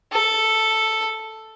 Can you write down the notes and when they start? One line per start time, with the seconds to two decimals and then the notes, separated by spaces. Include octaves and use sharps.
0.12 A4